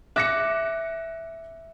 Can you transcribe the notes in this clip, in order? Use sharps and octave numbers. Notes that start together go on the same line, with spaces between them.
E5 D6 F#6 A#6 C#7